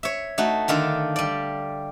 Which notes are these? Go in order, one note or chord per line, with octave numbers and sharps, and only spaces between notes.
C#5 E5
A3 D#4 F#4
D3 D#3 F4 A4
G3 D5